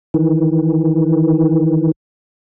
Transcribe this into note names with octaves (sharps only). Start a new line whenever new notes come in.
D#3 E3